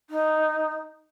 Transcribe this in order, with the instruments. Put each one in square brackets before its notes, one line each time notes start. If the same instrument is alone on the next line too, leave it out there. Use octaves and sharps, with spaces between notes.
[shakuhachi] D#4